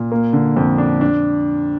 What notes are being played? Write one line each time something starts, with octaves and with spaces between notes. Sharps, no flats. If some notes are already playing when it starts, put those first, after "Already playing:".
Already playing: A#2
A#3
D3
F2
D4
D4